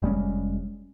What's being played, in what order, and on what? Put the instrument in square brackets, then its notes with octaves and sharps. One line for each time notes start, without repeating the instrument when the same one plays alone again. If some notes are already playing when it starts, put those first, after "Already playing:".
[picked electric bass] F1 G3 G#3 C#4